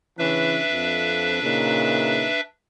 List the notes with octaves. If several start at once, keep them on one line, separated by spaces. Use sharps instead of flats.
C#3 E3 C#4 D4 B4 E5
F2
A#2 C#3 D#4